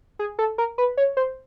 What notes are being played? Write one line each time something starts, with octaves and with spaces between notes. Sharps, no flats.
G#4
A4
A#4
B4
C#5
C5